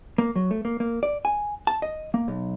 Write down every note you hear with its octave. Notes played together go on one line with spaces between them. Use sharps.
A#3
F#3
A3
A#3
A#3
D5
G#5
A5
D#5
A#3
B1